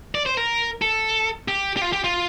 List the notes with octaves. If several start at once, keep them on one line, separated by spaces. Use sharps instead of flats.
D5
C5
A#4
A4
G4
G4
F4
G4
F4